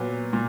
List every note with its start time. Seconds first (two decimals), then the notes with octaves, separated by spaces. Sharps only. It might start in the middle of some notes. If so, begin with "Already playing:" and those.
Already playing: A#2 F#3 B3
0.33 A#2